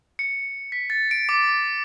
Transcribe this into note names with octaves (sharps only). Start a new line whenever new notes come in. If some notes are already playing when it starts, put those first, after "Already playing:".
C#7
B6
A6
D7
D6